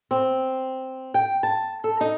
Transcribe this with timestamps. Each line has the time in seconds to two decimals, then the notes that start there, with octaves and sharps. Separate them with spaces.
0.11 C4
1.14 G5
1.43 A5
1.84 A4
2.01 D#4